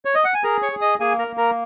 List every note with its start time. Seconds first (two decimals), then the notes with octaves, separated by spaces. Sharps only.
0.05 C#5
0.15 D#5
0.24 F#5
0.34 G#5
0.43 G#4 A#4 A#5
0.62 C#5 C#6
0.72 G#4
0.81 D#5 D#6
1.00 A#3 G#4 G#5
1.19 A#4 A#5
1.28 A#3
1.38 A#4 A#5